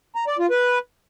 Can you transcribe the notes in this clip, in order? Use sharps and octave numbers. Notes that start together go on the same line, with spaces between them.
A#5
D5
F4
B4